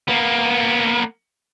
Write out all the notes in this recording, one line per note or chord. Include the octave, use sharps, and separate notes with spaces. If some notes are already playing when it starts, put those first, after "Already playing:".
A#3 B3